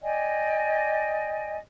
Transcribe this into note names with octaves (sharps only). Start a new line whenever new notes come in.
D5 D#5 G5 G#5